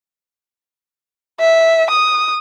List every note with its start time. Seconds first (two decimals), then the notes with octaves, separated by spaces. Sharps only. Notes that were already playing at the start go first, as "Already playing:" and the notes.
1.40 E5
1.90 D#6